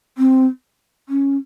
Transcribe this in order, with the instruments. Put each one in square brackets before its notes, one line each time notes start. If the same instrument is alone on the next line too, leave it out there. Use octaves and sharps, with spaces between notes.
[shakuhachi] C4
C#4